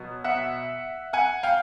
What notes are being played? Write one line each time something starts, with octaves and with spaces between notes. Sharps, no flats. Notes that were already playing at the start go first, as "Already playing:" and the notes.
Already playing: B2 F#3 B3
E5 F#5
F#5 G#5
F5 G5